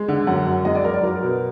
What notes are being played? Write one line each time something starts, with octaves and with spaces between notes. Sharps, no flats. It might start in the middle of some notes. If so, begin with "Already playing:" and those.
Already playing: G#3
D3
F#2 F#5
F#2
G#3 D#5
D5
F#2 A#4
D5
F#3 A#4
B2